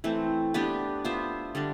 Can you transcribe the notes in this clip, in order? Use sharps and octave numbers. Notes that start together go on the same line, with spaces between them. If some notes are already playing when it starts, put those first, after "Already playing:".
E3 A3 C4
B3 D4 G4 B4
B3 F4 C5 E5
D3 G3 D4